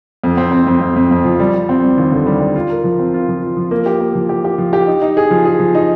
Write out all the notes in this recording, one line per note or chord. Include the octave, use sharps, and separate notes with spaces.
F2
C4
C4
F2
F2
F2
F2
F3
G3
G3
C4
G3
D#2
D3
G3
G3
F4
A#4
F3
C4
F4
F3
F4
F3
A#3
G4
A#3
F3
G4
G4
F3
G4
D#4
D#4
G#4
F3
G#4
F3
D#4